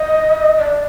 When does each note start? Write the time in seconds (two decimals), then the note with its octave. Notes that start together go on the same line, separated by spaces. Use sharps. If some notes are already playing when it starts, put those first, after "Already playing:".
Already playing: D#5
0.58 D5